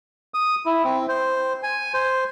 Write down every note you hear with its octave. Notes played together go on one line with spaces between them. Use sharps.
D#6
E4
C4
C5
G#5
C5